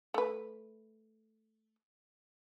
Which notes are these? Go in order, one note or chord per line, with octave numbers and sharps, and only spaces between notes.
A3 B4